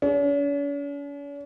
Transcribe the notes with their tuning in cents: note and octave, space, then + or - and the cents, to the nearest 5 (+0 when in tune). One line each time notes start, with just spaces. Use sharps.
C#4 +45